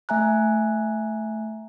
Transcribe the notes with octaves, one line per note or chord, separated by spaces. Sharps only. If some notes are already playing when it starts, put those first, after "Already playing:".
A3 E5 G#5 A#5 F#6